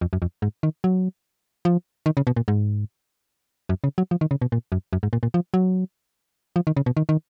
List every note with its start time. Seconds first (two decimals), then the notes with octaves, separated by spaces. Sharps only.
0.01 F2
0.13 F#2
0.22 F2
0.42 G#2
0.63 D#3
0.84 F#3
1.65 F3
2.06 D#3
2.17 C#3
2.27 B2
2.36 A#2
2.48 G#2
3.69 F#2
3.84 C#3
3.98 F#3
4.11 F3
4.21 D#3
4.31 C#3
4.41 B2
4.52 A#2
4.72 F#2
4.93 F#2
5.03 G#2
5.13 A#2
5.23 A#2
5.34 F3
5.54 F#3
6.56 F3
6.67 D#3
6.77 C#3
6.86 B2
6.97 D#3
7.09 D#3